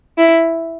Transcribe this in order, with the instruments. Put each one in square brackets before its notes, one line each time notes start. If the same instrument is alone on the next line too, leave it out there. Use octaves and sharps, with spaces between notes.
[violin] E4